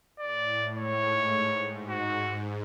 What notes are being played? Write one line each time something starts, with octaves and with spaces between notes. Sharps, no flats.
A2 D5
G#2 C#5
G#2
G#2 F#4